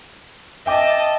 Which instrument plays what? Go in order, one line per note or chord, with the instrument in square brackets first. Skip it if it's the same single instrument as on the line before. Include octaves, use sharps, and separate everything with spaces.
[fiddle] D#5 A5 [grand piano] E5 G5 D6